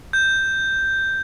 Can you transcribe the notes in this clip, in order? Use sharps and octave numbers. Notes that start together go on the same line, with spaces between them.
G6